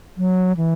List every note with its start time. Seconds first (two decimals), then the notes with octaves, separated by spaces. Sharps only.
0.17 F#3
0.57 E3